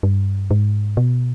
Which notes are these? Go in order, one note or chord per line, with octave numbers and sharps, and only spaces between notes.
G2
G#2
B2